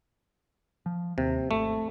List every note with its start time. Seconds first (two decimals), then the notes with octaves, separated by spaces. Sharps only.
0.86 F3
1.18 D#2 C3
1.51 G#1 A3